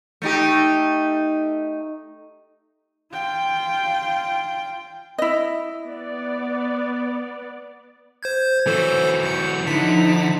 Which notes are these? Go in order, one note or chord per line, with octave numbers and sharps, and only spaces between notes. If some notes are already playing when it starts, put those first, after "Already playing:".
A3 D#4 G4
F4 G5
E4 D#5
B3 D5
C5 G6 G#6
E3 F#3 A4 C5
G6 C#7
D3 F3 D#4 E4 B6